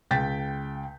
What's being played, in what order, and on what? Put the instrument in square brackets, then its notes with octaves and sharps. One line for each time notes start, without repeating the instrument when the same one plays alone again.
[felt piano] C#2 G5 G6 A6 B6